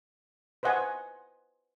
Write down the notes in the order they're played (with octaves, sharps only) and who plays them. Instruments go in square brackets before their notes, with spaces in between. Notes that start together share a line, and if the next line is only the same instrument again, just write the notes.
[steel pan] B4 C5 D#5 F#5 G#5